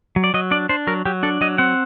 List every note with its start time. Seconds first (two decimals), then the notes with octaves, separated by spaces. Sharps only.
0.16 F#3
0.24 D5
0.34 F#3 D#5
0.51 D4 D5
0.69 D4 C5
0.87 F#3 A#4
1.05 F#3 G4
1.23 D4 A4
1.41 F#3 D#5
1.58 C4 F#5